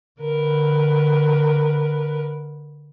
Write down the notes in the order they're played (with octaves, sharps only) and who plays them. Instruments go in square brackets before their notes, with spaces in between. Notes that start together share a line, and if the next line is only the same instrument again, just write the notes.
[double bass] D3 [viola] A#4 B4